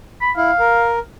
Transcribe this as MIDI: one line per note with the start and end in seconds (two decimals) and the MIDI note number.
0.21 0.31 83
0.37 0.51 64
0.37 0.90 77
0.59 0.99 70